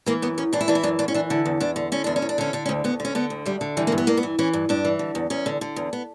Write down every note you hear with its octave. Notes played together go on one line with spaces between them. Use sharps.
E3 A#3
F#2 B3
F#2 C#4
E3 D4
E4
E3 D4
E4
F#2 D4
F#2 D4
C#4
E3 D4
D3 E4
E2
E2 D4
D3
D3 C#4
E2 D4
C#4
E2
D4
D3 C#4
D3 D4
C#4
D2
D2 B3
D3 C#4
D3 B3
D2
D2 G3
D3
E3 G3
A#3
G2
B3
G2 A#3
B3
E3
E3 C#4
G2
G2 D4
E3
D3
E2
E2 C#4
D3
D3
E2
B3